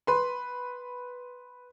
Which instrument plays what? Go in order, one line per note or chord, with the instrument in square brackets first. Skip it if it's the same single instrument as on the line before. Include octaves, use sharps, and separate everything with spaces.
[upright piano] B4 C6